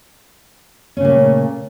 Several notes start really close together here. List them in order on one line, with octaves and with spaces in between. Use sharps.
C#4 C#3 A#2 A3